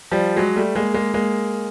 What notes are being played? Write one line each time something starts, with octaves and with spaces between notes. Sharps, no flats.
F3 G3
F#3 G#3
G3 A3
G#3 A#3
G#3 A#3
G#3 A#3